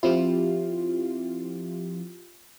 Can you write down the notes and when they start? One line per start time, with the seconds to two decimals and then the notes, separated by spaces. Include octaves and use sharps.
0.03 F3 C4 E4 F4 G4